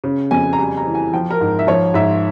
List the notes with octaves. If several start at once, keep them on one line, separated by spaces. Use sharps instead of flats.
C#3
F2 G#5
A#5
G3 G#5
A#5
E3
G#5
F3 G5
A#4
G#2
E5
F3 C#5
G#2 E5